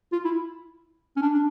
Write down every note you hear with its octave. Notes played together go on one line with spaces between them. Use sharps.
F4
E4
C#4
D4
D4